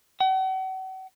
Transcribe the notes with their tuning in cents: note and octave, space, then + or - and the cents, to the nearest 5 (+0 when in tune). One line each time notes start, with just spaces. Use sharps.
F#5 +40